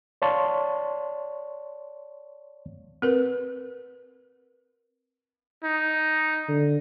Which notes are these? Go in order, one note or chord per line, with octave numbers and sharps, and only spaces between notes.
C#5 D5 F5 A5 C6 C#6
C4 A#4 B4
D#4
D3